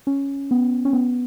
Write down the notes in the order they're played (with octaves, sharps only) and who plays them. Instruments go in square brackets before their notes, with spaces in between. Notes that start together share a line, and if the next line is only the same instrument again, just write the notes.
[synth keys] C#4
B3
C#4
B3